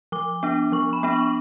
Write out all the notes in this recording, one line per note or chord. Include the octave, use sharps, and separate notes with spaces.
F3 D6
B3 D4
F3 C#6
B5
B3 D4
C#6